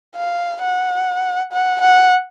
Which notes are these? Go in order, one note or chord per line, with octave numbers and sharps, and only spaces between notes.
F5
F#5
F#5
F#5